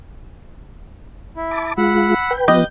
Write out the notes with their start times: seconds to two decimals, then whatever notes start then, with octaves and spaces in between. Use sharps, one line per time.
1.36 E4
1.51 A5 D6
1.78 G#3 F4 F#5 B5 E6
2.31 B4 G5
2.48 F3 B3 G4 B4 D#5 G6